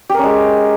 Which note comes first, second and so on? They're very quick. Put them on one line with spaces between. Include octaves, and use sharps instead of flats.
G4 A#4 C#4 G#3